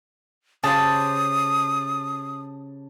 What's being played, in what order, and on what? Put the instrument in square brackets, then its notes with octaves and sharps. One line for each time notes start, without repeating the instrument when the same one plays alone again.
[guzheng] C#3 G4 C5 [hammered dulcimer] A5 [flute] D#6